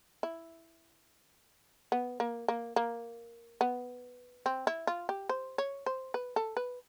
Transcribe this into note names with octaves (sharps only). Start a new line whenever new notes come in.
E4
B3
A#3
A#3
A#3
B3
C4
E4
F4
G4
C5
C#5
C5
B4
A4
B4